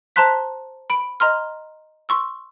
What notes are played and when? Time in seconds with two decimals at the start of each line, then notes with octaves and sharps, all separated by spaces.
0.16 C5 A5 A#5 C6 F#6 B6
0.90 B5 D7
1.20 D#5 A#5 C6 F6
2.09 C6 C#6 E6